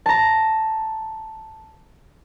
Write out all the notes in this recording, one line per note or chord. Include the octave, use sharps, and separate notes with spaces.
A5 A#5